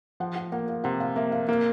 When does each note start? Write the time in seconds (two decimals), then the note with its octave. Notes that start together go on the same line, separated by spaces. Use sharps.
0.20 F3 F#5
0.36 F#5
0.52 A#3 F#5
0.69 F5
0.84 C3 F#5
1.00 F5
1.16 A#3 E5
1.32 F5
1.48 A#3 F5